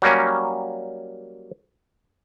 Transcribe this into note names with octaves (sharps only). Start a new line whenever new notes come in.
F#3 G3 A#3 C#4